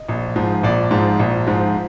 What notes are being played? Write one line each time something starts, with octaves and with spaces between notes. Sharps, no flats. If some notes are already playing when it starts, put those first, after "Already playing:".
Already playing: D#5
A#1
G#2 F3
A#1 D5
G#2 F3
A#1
G#2 F3